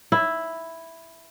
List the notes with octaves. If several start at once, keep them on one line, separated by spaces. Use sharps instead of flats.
E4